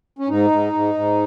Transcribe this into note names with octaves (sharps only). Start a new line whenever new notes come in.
C#4
G#2 D#4
G#2
G#2
G#2